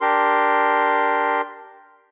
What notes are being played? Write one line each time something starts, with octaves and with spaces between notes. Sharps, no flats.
D4 G4 A#4 C6